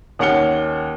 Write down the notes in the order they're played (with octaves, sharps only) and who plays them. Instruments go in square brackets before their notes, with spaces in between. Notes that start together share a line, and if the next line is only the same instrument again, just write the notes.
[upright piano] D#2 C#4 F#5 F6 C#7 G7